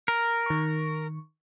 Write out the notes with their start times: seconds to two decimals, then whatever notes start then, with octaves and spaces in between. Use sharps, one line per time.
0.08 A#4
0.46 D#3 C#6